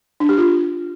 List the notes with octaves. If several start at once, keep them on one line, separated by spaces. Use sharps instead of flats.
D4
G4
F4